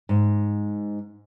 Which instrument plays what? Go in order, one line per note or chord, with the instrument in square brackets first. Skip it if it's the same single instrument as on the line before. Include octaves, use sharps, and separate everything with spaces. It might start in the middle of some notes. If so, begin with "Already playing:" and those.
[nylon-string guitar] G#2